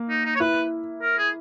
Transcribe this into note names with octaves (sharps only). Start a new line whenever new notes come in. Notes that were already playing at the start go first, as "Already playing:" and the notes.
Already playing: A#3
D#4
D#4
C#5
E4 B4
A#4
G#4